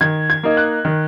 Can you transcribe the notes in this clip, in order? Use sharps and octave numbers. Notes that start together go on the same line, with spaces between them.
D#3 G#6
G#6
A#3 D#4
F#6
D#3